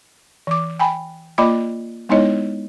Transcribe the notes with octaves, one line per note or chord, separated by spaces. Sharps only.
E3 D6
G5 G#5 B5
A#3 F4 D5 D#5 B5 D6
G#3 B3 D#4 E4 C#5 D#5